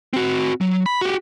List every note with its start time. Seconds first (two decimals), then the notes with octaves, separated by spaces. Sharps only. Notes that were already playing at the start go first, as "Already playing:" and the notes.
0.13 C4 F#4
0.61 F#3
0.86 B5
1.01 F#4 G4